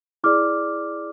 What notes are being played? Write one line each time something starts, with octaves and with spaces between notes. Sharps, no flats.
E4 G#4 D5 D6 F6